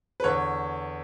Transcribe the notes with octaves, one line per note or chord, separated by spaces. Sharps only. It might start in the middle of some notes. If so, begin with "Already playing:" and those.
B4
E2 D3 C#5